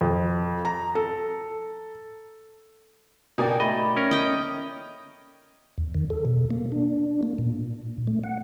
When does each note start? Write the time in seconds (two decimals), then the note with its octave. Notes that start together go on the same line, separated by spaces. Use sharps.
0.01 F2
0.65 A#5
0.95 A4
3.38 B2 A#3 D#4 D5 G5 G#5
3.60 A3 D#5 B5
3.97 C#4 A#4
4.11 D#5 G5
5.78 E2
5.95 D#3
6.10 A4
6.25 B2
6.51 A#3
6.72 D4
7.23 A#3
7.38 A#2
8.07 A3
8.24 F#5